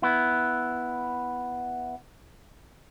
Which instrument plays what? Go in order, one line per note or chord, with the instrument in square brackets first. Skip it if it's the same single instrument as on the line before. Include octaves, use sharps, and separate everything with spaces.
[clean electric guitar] B3 E4